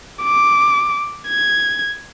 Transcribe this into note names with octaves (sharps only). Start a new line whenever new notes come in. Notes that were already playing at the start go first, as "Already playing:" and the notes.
D6
G#6